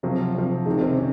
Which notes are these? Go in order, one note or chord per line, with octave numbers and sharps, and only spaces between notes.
C3 F3 F#3
C3 F3
C3 D#3 G#3
C4
C#4